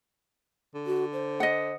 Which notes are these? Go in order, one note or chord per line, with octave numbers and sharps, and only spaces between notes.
D3
F#4
C5
D#5 F#5